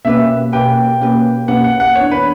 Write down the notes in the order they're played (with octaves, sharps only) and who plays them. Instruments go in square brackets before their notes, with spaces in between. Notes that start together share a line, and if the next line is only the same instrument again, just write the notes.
[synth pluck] B2 A#3 C#4 G4 B4 [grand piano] E5
[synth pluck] B2 A#3 C#4 G4 B4 [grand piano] G5
[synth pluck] B2 A#3 C#4 G4 B4
[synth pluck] B2 A#3 C#4 G4 B4 [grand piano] F#5
[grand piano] F#5
F#5
[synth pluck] E3 B3 D4 [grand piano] C#5
[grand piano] B4